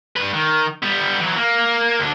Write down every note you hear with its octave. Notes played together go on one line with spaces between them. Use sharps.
G2 B4
D#3
G3 B3
E3 F#3
A#3
D2 D4